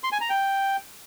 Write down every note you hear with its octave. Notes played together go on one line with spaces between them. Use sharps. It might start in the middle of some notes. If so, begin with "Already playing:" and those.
C6
G#5
A#5
G5